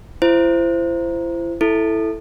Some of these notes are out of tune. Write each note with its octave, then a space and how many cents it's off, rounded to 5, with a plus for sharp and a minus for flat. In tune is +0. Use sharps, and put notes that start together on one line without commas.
E4 +40 C5 -10
E4 +0 A4 +0